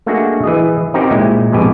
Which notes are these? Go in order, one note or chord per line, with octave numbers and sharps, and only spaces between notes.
A3 A#3 D4 D#4 F#4 G#4
E3 G#4 D#5
C4 C#4 D#4 F#4 G4 A#4
A#2 G#3 E4 G5
F2 G#2 B2 G4 D#5 G#5